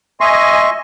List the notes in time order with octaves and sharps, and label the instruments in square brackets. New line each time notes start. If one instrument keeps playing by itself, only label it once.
[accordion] D#5 G#5 [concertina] E5 C#6 [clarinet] C6